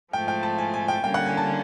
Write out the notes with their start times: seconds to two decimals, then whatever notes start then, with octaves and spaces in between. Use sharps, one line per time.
0.13 G#2 F3 A3 G5
0.28 G5
0.43 A5
0.58 G#5
0.74 G#5
0.88 G5
1.04 D3 G3 A#3 C#4 G5
1.14 F#5
1.26 G#5
1.37 A5